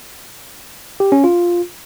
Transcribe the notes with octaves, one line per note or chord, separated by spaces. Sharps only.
G4
C#4
F4